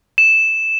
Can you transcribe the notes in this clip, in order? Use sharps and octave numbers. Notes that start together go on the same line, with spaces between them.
E7